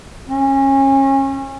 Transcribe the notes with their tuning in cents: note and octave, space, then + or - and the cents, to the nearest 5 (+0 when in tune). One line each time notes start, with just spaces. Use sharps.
C#4 -30